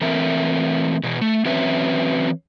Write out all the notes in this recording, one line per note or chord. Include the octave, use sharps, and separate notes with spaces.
E3 A3 C4 A#4 E5
B2 E3
A3
E3 F#3 C4 C#4 B4 E5